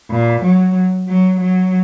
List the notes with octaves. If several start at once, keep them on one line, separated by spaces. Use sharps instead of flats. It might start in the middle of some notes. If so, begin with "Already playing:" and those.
A#2
F#3
F#3
F#3